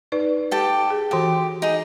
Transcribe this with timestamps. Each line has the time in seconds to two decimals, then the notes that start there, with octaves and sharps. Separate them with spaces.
0.12 D#4 B4 D5
0.51 G4 A4 G5
0.90 G#4
1.11 E3 F#4 G4 A4
1.62 D#4 G#4